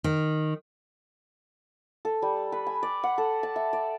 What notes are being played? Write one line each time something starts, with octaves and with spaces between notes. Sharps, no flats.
D#3
A4
G3
B4
G#5
D5
F#5
A4
A5
E5
D5